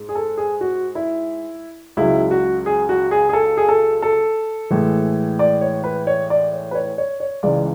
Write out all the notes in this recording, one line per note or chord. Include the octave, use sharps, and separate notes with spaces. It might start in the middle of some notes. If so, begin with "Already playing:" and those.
Already playing: G#2 G#3
G#4
A4
G#4
F#4
E4
C#2 C#3 F#3 E4
F#4
G#4
F#4
G#4
G#4
A4
G#4
A4
A4
A2 E3 G#3
D5
C#5
B4
C#5
D5
C#5
B4
C#5
C#5
C#5
C#2 C#3 E3 G#3 D5